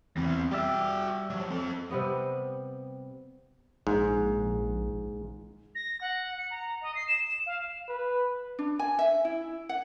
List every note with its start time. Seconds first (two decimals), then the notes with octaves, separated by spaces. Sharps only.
0.17 E2 C4 E4
0.51 G3 F#4 D5 E5 G5
1.30 F3 F#3
1.50 C4 A4
1.90 C3 G3 B3 D#5
3.87 A#1 G#2
5.75 A#6
6.01 F#5
6.38 C#7
6.50 A#5
6.81 D#5
6.95 C7
7.08 E7
7.28 E7
7.46 F5
7.89 B4
8.59 D4
8.79 G#5
8.99 E5
9.25 E4
9.69 F#5